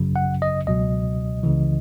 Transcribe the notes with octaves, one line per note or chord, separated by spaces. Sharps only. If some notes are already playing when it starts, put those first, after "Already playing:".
Already playing: G#1 F#2 C#3 F#3
F#5
D#5
C#2 B2 F#3 D#5
C#2 C#3 E3